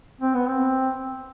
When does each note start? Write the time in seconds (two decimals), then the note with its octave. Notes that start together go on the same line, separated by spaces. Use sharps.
0.22 C4
0.34 B3
0.47 C4